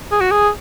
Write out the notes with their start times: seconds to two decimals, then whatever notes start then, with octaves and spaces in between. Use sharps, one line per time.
0.12 G#4
0.21 F#4
0.31 G#4